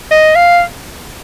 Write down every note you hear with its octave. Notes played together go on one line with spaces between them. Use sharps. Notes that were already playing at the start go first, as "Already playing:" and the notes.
D#5
F5